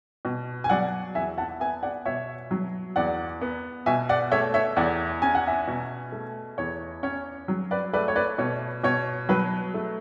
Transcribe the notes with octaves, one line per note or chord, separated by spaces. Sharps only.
B2
G#5
F#3 D5 F#5
E2 E5 G#5
F#5 A5
B3 E5 G#5
D5 F#5
B2 C#5 E5
F#3
E2 D5 F#5
B3
B2 E5 G#5
D5 F#5
A3 C#5 E5
C#5 E5
E2 D5 F#5
C#4 G#5
F#5
E5 G#5
B2
A3
E2 C#5
C#4 C#5
F#3
B4 D5
A3 B4 D5
C#5
B4 D5
B2 C#5
B2 C#5
F#3 B4
A3